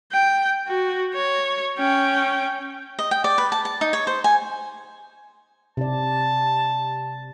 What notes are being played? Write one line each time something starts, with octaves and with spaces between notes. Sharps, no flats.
G5
F#4
C#5
C#4 G5
D#5
G5
D5
B4
A5
A5
D#4
C#5
C5
G#5
C3 D5 A5